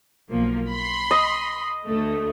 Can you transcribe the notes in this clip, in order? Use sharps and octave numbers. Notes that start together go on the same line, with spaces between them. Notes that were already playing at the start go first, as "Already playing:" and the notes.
B1 F3 A#3
B5 C6
D#5
D2 A3